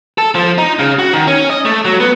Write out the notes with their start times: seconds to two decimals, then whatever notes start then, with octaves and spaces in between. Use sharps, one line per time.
0.18 A4
0.35 F3
0.58 D#4
0.79 C#3
0.99 F#4
1.13 D#3
1.27 C#4
1.50 D#5
1.65 A3
1.85 F#3
2.00 B3